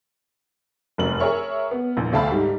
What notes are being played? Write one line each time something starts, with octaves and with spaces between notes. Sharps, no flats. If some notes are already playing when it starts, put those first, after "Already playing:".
F1 F#2 F#7
G#4 A#4 C#5 E5 C#6 F6
B3
A#1 E2
D2 E5 F5 A5 B5
G#2 G3